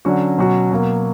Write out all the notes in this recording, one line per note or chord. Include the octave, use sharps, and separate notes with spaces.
D3 F#3 C#4 F#4
B2 F#3 C#4 F#4
B2 F#3 A#3